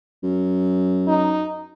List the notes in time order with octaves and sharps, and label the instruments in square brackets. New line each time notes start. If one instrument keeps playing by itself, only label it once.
[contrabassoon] F#2
[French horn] D#4